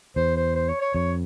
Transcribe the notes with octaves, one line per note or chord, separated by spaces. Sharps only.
E2 C5
C5
C5
C#5
C#5
F2 C#5